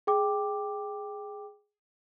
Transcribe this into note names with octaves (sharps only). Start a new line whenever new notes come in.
G#4 G5 D6